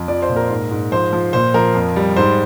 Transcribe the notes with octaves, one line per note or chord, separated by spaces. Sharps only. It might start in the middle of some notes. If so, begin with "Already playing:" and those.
Already playing: F2
F3 D5
C5
A#2
A#4
G#2
G#2
F3 C5
F3
A#2 C5
F3 A#4
F2
G3
G#2 C5